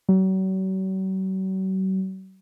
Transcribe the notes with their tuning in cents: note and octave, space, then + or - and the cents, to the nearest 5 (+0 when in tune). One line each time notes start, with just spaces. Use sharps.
F#3 +40